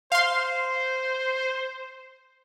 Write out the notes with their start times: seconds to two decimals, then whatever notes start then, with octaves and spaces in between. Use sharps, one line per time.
0.12 C5 F5 C6